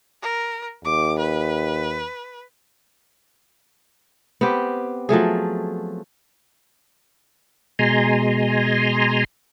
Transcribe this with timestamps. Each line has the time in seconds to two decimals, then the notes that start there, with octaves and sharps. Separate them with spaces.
0.22 A#4
0.85 D#2 D6
1.19 B4
4.41 B3 C4 G4
5.09 F3 F#3 A3 G#4
7.79 B2 G#3 G#5 A#5 C6